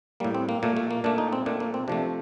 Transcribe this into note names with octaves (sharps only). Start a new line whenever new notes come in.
A2 G3 A#3
C4
A#3
A#2 A3 A#3
A3
A#3
A#2 A3 D4
D#4
C4
A#2 A3 D4
A#3
C4
C3 F3 A3 D4